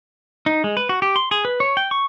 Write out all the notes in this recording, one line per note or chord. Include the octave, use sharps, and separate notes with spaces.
D#4
G#3
B4
F#4
G4
C6
G#4
B4
C#5
G5
C#6